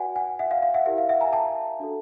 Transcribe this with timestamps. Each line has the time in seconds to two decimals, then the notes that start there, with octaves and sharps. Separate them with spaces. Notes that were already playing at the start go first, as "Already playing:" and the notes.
Already playing: F#4 B4 D5 F#5 G#5
0.16 F#5 G#5
0.39 E5 F#5
0.51 F5
0.62 F5
0.74 E5 F#5
0.86 E4 G4 A#4 E5
0.98 F5
1.09 E5 F#5
1.21 G#5 A#5
1.33 G5 A5
1.80 D4 F#4 A4